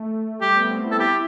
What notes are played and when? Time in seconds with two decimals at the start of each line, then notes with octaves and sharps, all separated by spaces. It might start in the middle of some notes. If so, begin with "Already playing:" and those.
Already playing: A3
0.41 G3 G4
0.56 B3
0.70 C4
0.85 E4
0.91 A4
0.99 E4 G4